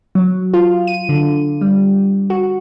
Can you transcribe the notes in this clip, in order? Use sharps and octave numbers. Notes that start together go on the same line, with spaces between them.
F#3
F4
D#7
D3
G3
F#4